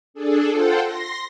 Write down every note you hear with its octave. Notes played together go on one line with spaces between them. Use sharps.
D4 G#4 A4
F4 A4 C5 F#5 G5
C6 A#6